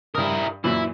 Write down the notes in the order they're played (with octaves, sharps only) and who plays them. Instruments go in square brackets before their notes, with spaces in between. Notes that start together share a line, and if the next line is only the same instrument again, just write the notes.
[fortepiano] G2 D#6 [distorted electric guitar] E4 A#4
[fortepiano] F#2 A#2 E3 [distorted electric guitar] E4